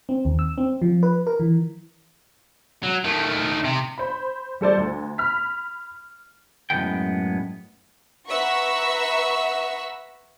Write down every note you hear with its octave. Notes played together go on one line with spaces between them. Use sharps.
C4
D#2
E6
C4
F3
B4
A#4
E3
F#3
D#3 A3
C3
C5 B5
G3 A4 C5 D5
D2
B5 F6 B6
F#2 A2 F#3 G#3 B3 G5
B4 E5 F#5 A#5 C#6 E6